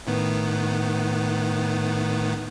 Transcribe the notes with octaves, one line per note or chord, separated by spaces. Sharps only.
A2 D#3 B3